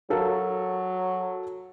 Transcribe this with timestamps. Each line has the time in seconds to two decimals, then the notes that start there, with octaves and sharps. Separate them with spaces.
0.10 F#3 A4 A#4 F5